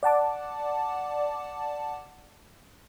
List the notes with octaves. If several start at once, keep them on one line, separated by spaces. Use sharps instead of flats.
D5 F#5 A5 D6